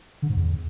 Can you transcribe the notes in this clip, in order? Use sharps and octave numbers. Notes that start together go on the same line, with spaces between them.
D3
G#2
E2